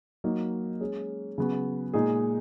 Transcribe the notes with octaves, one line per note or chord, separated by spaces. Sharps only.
F#3 A#3 D#4
G#3 C#4 G#4
C#3 F#3 B3 F#4
A#2 G#3 D#4 G#4